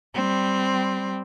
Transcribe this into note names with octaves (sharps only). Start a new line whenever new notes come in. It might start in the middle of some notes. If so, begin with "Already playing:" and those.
G3 C4